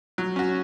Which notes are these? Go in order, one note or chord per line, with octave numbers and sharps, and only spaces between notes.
F#3
C#4 F#4